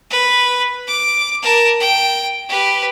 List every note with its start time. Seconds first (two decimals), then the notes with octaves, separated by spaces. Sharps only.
0.10 B4
0.87 D6
1.42 A#4 A5
1.80 G5
2.49 G4 B4